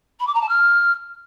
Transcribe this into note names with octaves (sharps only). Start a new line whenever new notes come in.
B5
D6
A#5
A5
F6